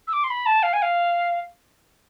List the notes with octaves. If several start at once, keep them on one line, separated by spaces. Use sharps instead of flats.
E6
D6
C6
B5
A5
F5
G#5
F5